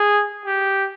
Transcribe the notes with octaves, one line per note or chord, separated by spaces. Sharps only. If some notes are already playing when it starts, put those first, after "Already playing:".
Already playing: G#4
G4